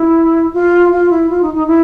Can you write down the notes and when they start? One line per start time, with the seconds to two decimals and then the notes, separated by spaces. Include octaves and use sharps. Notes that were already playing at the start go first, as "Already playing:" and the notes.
Already playing: E4
0.54 F4
0.92 F4
1.10 E4
1.30 F4
1.42 D#4
1.54 D#4
1.67 E4